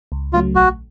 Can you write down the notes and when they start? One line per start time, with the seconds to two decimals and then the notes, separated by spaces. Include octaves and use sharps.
0.12 C#2
0.33 C#3 F#3 A3 F4
0.55 A#1 F#4